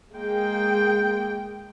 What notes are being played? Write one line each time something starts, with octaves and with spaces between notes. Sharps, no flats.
G#3 A#3 G5